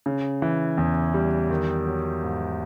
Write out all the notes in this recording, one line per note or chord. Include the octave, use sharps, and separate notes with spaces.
C#3
E3
E2
G3
D#3
F#3
G#2